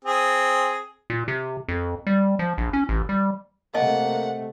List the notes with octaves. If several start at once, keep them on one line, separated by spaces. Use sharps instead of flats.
C4 G#4
A#2
C3
F2
G3
F3
A#1
C#4
A1
G3
C3 A3 A#3 D#5 F#5 G#5 A5